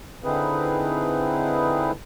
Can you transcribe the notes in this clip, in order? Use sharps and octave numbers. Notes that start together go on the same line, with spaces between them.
D3 C4 D#4 E4 G#4 B4